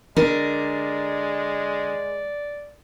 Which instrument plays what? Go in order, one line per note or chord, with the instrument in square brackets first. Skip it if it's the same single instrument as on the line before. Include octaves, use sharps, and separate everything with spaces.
[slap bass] D3 [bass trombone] G#3 [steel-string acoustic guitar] A#4 [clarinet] D5